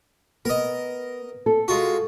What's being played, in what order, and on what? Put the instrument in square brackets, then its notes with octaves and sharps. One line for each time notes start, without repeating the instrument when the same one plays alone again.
[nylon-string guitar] B3 [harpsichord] A#4 D#5
[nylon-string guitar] A4
[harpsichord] G#3 F4 F#4